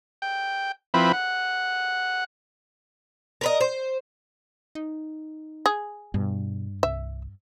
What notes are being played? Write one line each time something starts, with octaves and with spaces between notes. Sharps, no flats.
G5
F3 C4 E4 B4 B5
F#5
A#4 B4 D#5
C5
D#4
G#4
G2 B2
C2 E5